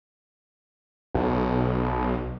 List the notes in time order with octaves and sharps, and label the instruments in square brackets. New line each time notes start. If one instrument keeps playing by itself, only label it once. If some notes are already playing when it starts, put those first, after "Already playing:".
[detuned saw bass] B1